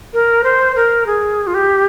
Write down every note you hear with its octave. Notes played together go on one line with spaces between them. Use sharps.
A#4
C5
A#4
G#4
F4
G4